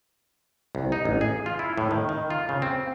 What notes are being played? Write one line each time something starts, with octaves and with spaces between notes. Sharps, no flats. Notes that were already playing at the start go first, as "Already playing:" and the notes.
C2
D#4
A1
G#4
F4
E4
A2
D#3
D#3
F4
C#3
C4